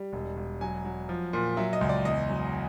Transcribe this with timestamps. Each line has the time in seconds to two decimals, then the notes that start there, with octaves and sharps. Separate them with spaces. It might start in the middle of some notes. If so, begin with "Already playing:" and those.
Already playing: G3
0.13 E1
0.37 E1
0.61 F#3 G#5
0.85 F#3
1.09 F3
1.33 A#2
1.57 F#3 E5
1.73 D#5
1.81 C#2
1.89 D5
2.05 E2 D#5
2.29 F#3